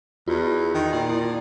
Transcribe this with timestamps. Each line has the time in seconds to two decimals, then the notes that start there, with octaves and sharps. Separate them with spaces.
0.28 E2 F4 F#4
0.74 D#3
0.93 A#2 G5
1.09 E4